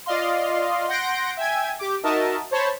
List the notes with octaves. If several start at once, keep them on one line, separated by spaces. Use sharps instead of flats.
F4 D5 D#5 F5 C6
F#5 C6 G6 A#6 D7
E5 G5 G#5 G#6
G4 D6
D#4 F#4 A#4 D#5 E5 A5
C5 C#5 A5 B5